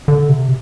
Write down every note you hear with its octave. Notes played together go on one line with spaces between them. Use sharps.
D3
C3